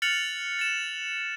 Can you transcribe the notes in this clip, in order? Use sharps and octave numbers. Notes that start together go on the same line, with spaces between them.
F6 F#6 A6 C#7 F7 F#7
A6 E7